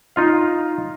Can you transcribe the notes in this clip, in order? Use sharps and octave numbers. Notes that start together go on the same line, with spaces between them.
D#4 F4 F5